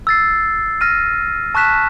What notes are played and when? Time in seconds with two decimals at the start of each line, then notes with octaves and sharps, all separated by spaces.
0.07 E6 A6 C7
0.81 F6 A#6 D#7
1.55 A5 C#6 F#6 B6 E7